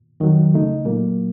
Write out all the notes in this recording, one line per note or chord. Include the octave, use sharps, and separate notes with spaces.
F2 D#3 F#3
C#2 C#3 A3 D#4
A#2 F#3 A#3